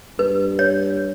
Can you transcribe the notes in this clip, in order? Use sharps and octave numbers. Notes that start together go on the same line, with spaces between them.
G2 B4
C#5